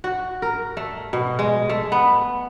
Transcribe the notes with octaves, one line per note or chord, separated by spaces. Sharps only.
F#4
A#4
A3
B2
G#3
A3
B3